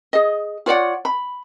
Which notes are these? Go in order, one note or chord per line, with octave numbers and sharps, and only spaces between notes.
G#4 D#5
F4 C#5 D5 F#5
B5